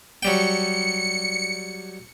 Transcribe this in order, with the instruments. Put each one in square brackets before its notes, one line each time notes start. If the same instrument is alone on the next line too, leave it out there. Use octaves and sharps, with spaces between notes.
[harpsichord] F#3 G3 G5 [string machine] C#7